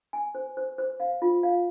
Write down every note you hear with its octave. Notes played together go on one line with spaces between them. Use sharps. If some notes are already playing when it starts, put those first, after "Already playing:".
G#5
C5
C5
C5
F5
F4
F5